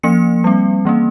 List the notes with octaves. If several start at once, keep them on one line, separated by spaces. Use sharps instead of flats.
F3 A#3 C#4 C#7
G3 C4
E3 A#3 C#4